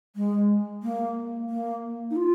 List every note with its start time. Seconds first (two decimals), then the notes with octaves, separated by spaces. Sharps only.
0.16 G#3
0.83 A#3
1.49 A#3
2.11 D#4
2.16 F4